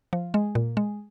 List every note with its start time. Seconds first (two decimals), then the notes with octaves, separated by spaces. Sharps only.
0.13 F3
0.34 G#3
0.55 A#2
0.77 G#3